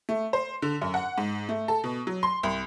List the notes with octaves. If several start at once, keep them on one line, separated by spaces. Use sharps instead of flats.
A3
C5
D3
F#2
F#5
G#2
A3
A4
B2
F#3
C6
C2